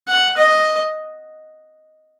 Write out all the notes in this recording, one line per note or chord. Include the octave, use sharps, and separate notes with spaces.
F#5
D#5